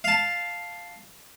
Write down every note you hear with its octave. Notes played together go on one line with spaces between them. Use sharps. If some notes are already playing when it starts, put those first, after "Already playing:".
F5 A5